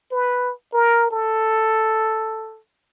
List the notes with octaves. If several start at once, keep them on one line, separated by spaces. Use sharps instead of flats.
B4
A#4
A4